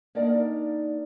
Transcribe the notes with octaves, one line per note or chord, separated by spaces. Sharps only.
A#3 D4 D#4 A#4 D5 F5